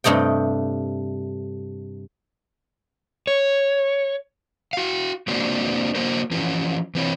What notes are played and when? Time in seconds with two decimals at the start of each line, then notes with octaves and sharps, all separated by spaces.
0.04 G2 C3 A3 D#5 G5
3.27 C#5
4.73 F#4 F5
5.28 G#3 A#3 C4 D4 F#4
5.95 A#3 F#4 A#4 C5
6.31 E3 F3 C#4
6.95 E3 C4 C#5